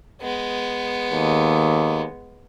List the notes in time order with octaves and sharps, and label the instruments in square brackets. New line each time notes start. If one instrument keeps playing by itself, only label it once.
[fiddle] G#3 B3
[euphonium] D#2